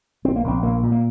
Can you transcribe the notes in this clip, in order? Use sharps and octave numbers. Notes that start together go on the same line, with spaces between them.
A#1 C4
A#3
A#1 C4
A#2 A#3
A#2
A#3